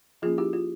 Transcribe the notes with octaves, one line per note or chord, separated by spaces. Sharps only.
F3 A#3 C#4 F4 G#4
E4 G4
F4